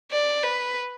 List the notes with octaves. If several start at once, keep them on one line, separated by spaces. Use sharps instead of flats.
D5
B4